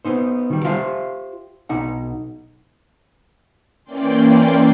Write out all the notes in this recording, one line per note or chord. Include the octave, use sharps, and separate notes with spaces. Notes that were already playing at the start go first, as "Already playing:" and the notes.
B3 D#4 C5
D#3 G3
F4 G4 C5 E5 F5
B1 D#4 F#5
E3 A#3 C#4 D5 G5 C6